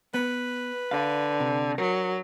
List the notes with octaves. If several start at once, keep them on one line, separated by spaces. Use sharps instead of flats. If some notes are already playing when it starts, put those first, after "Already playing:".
B3 B4
D3 D5 F5
C3
F#3 A#4